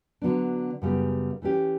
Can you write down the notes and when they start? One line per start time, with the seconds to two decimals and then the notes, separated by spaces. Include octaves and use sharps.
0.22 D3 F#3 B3 D4
0.82 F#2 C#3 G3 B3
1.42 E3 A3 C#4 G4